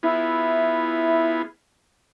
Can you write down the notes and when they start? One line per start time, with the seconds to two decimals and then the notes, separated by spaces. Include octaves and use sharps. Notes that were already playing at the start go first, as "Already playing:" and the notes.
0.03 B3 E4 F4 G#4